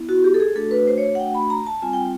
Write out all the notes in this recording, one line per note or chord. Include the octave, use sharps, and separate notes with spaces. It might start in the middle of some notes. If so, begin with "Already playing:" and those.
Already playing: B3 E4
F#4
G4
A4
G#4
A3 D4 F#4 A4
B4
C5
C#5
F#5
G5
B5
A#5
A5
G3 C4 F4 G#5
G5